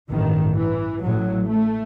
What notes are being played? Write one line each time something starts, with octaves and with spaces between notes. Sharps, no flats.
A1 G2 D#3
E3
A1 A2 F#3
A3